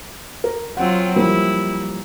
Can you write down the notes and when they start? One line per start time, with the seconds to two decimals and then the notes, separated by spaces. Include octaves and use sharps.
0.44 A#4
0.77 F#3 C4 F4 F#5
1.16 F3 G3 A#3 E4